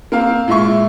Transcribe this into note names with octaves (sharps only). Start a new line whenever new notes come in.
A#3 C4 F5
A#2 G#3 F4 E5 C#6